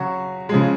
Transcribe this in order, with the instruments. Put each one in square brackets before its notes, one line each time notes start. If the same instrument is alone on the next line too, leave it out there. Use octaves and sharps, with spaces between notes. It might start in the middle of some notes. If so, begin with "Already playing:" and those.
Already playing: [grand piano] C#3 F#3 C#4 F#4
C#3 F3 G#3